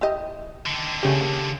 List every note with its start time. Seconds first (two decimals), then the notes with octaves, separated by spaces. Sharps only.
0.01 E4 G4 D#5
0.66 D3 D#3
1.03 C#3 G3 A3 C#4 G4
1.21 A#3